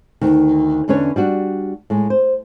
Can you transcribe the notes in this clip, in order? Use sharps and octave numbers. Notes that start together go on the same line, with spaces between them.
D2 D#3
E2 D3 C#4 D4 B4 C#5
G3 D4 F#4
A2 G#3
C5